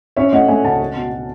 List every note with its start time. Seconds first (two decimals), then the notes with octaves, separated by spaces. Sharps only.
0.17 C#4 C#5 E5
0.33 A3 D#5 F#5
0.48 A3 E5 G#5
0.64 C#2 F#5 A5
0.80 G#3
0.95 B2
1.11 B2